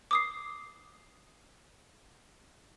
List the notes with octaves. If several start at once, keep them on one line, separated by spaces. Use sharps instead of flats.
D6 D#6 C7